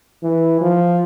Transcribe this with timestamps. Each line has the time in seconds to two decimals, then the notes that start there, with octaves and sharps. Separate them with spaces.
0.23 E3
0.61 F3